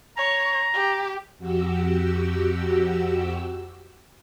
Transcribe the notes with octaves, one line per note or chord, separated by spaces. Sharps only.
C#5 A#5
G4
F2 F#4 G4 E6